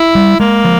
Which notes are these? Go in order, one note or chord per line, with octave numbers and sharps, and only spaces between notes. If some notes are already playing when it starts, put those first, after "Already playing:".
Already playing: E4
G3
G#3 A#3
F3